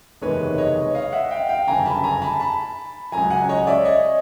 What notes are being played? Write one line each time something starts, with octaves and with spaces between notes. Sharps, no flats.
F#1 E2 C3 D#3 G#3 B4 C#5
C#5 D#5
D#5 F5
E5 F#5
F5 G5
F5 G5
G1 F#2 C#3 G#5 A#5
A5 B5
G#5 A#5
A5 B5
A5 B5
C#2 C#3 F#3 G#5 A#5
F#5 G#5
C#5 D#5
D5 E5
C#5 D#5